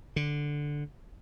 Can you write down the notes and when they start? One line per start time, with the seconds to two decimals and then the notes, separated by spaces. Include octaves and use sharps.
0.16 D3